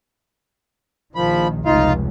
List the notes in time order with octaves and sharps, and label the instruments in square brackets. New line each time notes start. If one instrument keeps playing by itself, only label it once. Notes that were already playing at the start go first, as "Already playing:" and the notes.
[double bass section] A#1 D#3 [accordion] F3 B5
[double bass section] F1 C#2 [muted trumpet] D#4 [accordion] F4 F5